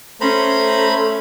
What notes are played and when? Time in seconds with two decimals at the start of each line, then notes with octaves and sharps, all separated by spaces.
0.21 A3 C#4 C5 A#5 B5